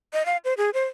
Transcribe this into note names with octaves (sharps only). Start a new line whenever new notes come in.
D#5
F5
C5
G#4
C5